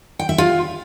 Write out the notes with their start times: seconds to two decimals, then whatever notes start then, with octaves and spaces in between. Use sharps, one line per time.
0.19 G5
0.29 E5
0.38 F4